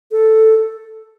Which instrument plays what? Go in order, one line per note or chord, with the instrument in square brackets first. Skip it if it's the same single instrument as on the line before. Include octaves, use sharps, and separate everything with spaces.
[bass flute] A4